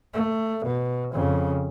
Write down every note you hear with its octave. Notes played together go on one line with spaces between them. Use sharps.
A3
B2
F2 C#3